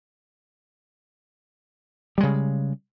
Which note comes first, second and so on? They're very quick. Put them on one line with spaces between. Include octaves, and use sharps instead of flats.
G3 G#3 C#3